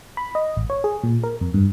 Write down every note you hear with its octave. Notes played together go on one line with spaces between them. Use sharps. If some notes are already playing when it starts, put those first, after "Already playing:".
B5
D#5
A1
C#5
G#4
A#2
A#4
F2
G2